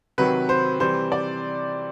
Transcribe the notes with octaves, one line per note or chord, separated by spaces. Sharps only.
C3 D#3 F#3 B4
C5
C3 E3 G3 C5
D5